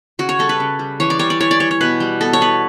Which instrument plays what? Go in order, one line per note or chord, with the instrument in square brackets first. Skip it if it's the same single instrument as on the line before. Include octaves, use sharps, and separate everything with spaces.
[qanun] C#3 F#4
C#5
G3 A4
B4
C#3
G3
E3 C#5
D5
G3 C#5
D5
E3 C#5
D5
G3 C#5
C#5
B2 B4
G3
B3 A4
C#5
B3 B4